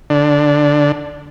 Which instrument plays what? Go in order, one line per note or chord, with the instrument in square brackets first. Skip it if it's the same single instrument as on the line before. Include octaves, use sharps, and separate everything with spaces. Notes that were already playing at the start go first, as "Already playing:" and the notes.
[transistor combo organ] D3